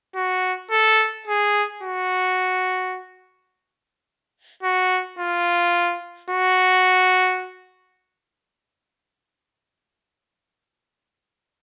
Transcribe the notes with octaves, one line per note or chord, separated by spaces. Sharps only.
F#4
A4
G#4
F#4
F#4
F4
F#4